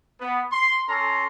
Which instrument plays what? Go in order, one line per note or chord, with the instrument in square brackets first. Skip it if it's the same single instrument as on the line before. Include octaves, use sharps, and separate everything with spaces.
[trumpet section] B3
C6
C#4 A4 A#5 C6